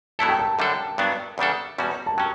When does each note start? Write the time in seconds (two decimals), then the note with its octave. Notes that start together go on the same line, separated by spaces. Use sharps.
0.19 B2 F#3 A3 E4 A4 A5
0.29 G5
0.39 A5
0.59 F#2 D3 G3 D4 A4
0.98 G2 F#3 B3 D4
1.38 E2 C#3 G3 D4 A4
1.78 E2 B2 G3 C#4 F#4
2.06 A5
2.17 F#3 C#4 G5